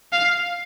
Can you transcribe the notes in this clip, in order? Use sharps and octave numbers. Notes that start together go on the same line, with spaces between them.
F5